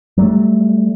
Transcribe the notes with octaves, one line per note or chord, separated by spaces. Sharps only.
F#3 G3 A3